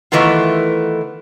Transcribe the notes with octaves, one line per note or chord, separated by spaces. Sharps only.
D#3 E3 A3 B3 F4